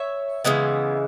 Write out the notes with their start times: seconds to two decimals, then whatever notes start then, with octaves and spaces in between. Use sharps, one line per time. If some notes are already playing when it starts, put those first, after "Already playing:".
Already playing: C#5 E5
0.44 C#3 E3 G#3 B3